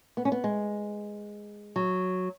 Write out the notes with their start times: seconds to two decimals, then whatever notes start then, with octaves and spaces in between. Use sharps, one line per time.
0.17 B3
0.25 C#4
0.32 B3
0.44 G#3
1.76 F#3